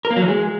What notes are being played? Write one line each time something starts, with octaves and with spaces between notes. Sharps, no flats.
A#4
A#3
F#3
E3
G#3